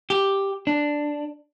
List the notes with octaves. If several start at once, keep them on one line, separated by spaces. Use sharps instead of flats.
G4
D4